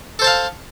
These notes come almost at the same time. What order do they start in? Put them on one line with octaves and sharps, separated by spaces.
A4 C5 A5 F5